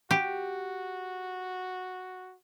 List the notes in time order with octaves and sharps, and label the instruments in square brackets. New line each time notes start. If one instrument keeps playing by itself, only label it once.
[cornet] F#4 [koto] G4